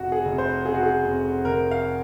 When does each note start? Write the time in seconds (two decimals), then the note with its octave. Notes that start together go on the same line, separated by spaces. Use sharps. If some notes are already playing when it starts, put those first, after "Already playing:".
Already playing: F1 F#4
0.12 G#4
0.25 F1
0.38 C5
0.66 C#3 G#4
0.74 F#4
0.83 G#4
1.05 F2
1.44 F1 A#4
1.71 F5